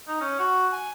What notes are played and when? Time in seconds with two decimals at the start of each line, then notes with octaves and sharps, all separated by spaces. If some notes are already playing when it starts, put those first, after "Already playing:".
0.08 D#4
0.21 C#4
0.39 F#4
0.73 G#5